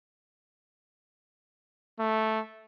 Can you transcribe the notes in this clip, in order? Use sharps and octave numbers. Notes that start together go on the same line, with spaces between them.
A3